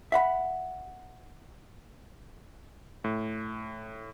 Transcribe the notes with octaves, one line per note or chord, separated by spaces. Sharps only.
E5 F#5 B5
A2